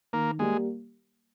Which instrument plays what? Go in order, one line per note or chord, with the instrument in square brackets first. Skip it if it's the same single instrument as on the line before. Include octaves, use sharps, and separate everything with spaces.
[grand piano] D#3 [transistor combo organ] A#3
[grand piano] G3 A#3 [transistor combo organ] G#3